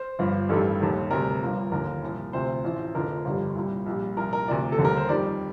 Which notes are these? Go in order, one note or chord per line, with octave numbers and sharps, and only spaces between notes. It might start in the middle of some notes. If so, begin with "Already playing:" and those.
Already playing: C5
G1 G2 F3
A1 G2 D#3 G3 A4
D#2 D#3 G3
D2 C3 G3 A#4
G1 G2 F3
D#2 D3 F3 A#4
C2 A#2 F3
D2 C3 F3 C5
A1 A2 F3
F1 F2 D3 F3 A#4
G1 F2 D3 G3
C2 A#2 G3
A#1 A#2 G3
C2 A#2 F3 A#4
A#4
D2 C3 F3 D5
A4
D#2 D3 G3
A#4
C5
F2 D#3 G3 D5